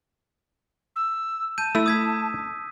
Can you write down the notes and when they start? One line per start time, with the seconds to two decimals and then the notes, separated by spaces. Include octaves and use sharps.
0.96 E6
1.58 A5 G6 D#7
1.75 A3 E4 E6
1.86 D#6 G#6 B6